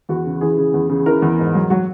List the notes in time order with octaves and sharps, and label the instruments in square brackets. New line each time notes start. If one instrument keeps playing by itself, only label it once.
[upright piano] E2 F#4
C#3
E3 G#4
C#3
E2
C#3
E3 A#4
E2
G#2
F#3
F#3 F#4